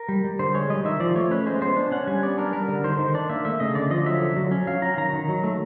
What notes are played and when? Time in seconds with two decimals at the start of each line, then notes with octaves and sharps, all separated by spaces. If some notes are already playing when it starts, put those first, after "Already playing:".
Already playing: A#4
0.09 G3
0.24 G3
0.39 D3 C5
0.54 G#3 C#5
0.70 G3 D#5
0.85 D#3 E5
1.00 F3 D5
1.16 A3 C#5
1.31 C#4 B4
1.46 G#3 C5
1.61 B3 C5
1.76 D4
1.92 C#4 F#5
2.07 G3 G#5
2.23 B3 D5
2.38 D4 A#4
2.53 G3 A#4
2.68 D3
2.84 D#3 C5
2.99 D#3
3.14 D4 D5
3.29 A#3 E5
3.45 A3 E5
3.60 C#3 D#5
3.75 D3 D5
3.90 F3 D#5
4.06 F#3 E5
4.22 D3
4.37 F#3
4.51 C#4
4.67 F#3 F5
4.82 F#3 A#5
4.97 D#3 A#5
5.13 D#3
5.28 F#3
5.43 A3